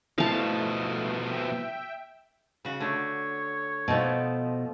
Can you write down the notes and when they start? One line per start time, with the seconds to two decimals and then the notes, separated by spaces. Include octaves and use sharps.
0.18 B2 F3 A3 E4 F5 A5
1.28 E5 G5
2.65 C#3 F#4
2.80 D3 A3 C#5
3.88 B2 F3 A3 D#4